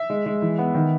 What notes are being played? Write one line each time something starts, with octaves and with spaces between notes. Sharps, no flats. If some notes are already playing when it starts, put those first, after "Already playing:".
Already playing: E5
G#3
G#3
E3
B3
D#3